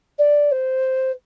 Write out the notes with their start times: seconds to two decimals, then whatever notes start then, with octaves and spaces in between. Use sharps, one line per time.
0.19 D5
0.52 C5